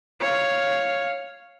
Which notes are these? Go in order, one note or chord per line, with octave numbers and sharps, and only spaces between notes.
C#5 F5